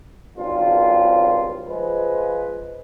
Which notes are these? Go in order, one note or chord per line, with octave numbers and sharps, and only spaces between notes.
G#1 C#2 G2 F4
F3 G#3 B4